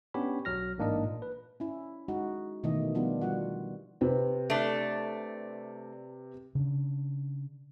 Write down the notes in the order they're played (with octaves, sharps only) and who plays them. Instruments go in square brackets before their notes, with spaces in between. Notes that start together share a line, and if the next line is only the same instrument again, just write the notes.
[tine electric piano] B3 C#4 D4 G4 C#5 B5
B1 F#3 F6 A#6
A1 G#2 A#3 D4 D#4 D#5
A#2
B4
[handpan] C#4 E4
G#3 D#4 F#4
B2 D#3 E3 A3 D#5
F3 G3 B3 D4 F4
G3 F4 F#4 F#5
[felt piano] C3 C4 B4
[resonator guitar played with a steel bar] A3 D4
[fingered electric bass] C#3 D4